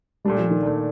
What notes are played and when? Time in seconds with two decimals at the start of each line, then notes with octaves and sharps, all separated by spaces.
0.25 A#2 G3 A3 D4
0.38 F3
0.50 D#3
0.63 A#2 A3 D4